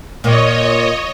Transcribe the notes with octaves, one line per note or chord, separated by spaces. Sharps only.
A#2 C#5 D#5